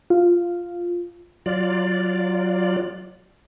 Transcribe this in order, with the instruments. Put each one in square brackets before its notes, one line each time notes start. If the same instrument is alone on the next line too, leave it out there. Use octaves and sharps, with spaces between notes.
[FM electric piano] F4
[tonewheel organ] F#3 F4 D5